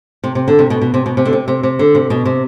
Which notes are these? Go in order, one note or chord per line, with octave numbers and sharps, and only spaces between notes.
C3
C3
D3
C3
B2
B2
C3
B2
C3
D3
C3
C3
C3
D3
C3
B2
C3